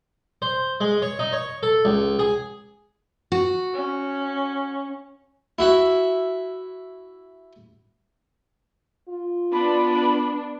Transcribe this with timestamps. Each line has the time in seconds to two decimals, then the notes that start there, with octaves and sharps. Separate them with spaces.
0.42 C5
0.81 G#3
1.02 C#5
1.19 D#4
1.33 C#5
1.63 A4
1.85 C#2
2.19 G#4
3.32 F#4
3.73 C#4
5.59 E4 F#4 E5
9.09 F4
9.53 B3 D4 B5